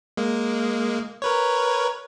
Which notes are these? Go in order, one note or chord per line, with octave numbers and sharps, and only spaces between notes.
G#3 A#3
A#4 B4 C#5